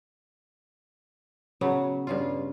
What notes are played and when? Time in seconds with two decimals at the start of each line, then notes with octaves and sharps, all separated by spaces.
1.61 C#3 F#3 B3
2.07 G2 C#3 F4